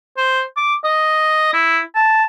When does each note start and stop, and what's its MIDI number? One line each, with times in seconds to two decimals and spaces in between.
0.17 0.42 72
0.57 0.75 86
0.85 1.49 75
1.53 1.80 64
1.95 2.24 81